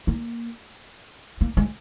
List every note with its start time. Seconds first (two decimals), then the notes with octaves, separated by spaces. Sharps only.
0.07 A#3
1.41 A#3
1.57 G#3